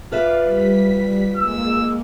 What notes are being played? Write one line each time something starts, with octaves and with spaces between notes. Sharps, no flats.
F4 B4 D5 E5 F5
G3 B6
G#3 A#3 E6